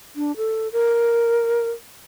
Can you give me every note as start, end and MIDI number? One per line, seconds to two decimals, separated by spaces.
0.16 0.35 62
0.37 0.68 69
0.72 1.70 70